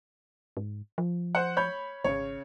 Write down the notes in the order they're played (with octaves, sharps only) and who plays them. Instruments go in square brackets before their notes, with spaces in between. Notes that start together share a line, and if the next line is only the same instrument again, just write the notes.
[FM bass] G#2
F3
[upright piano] C5 F#5
C#5 B5 G6
[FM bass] G#1 [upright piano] C#3 C#5